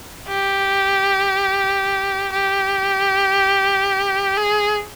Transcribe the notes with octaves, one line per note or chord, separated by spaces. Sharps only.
G4
G4
G#4